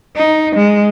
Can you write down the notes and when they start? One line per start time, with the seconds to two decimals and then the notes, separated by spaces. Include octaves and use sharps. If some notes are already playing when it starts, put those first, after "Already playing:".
0.16 D#4
0.56 G#3